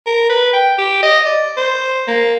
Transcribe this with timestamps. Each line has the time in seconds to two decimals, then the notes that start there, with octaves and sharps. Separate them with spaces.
0.06 A#4
0.30 B4
0.53 G5
0.78 G4
1.03 D#5
1.26 D5
1.57 C5
2.07 A#3